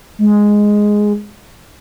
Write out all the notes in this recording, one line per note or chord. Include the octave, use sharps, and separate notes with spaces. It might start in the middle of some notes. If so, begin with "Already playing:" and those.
G#3